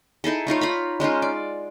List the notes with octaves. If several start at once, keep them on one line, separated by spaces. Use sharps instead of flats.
D#4 E4 G#4 A4
A3 D#4 F4 C#5
F4 A#5 B5
G#3 C#4 D#4 F4
D5